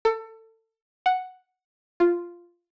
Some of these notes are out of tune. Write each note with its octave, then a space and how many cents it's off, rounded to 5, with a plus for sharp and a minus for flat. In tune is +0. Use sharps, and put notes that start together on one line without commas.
A4 +25
F#5 +0
F4 -5